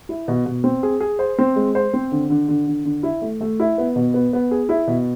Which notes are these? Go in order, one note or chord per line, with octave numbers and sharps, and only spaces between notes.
E4
B2
B2
C4
G#4
G#4
C5
C4
G#3
C5
C4
D3
D3
D3
D3
D3
E4
A3
A3
E4
B3
B2
B3
B3
G#4
E4
B2